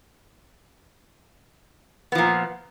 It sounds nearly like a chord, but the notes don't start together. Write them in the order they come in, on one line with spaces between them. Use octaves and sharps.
B3 F3 A#2